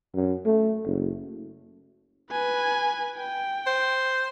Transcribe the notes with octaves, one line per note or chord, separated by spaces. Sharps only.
F#2
A3
F#1
B4 G#5
G5
C5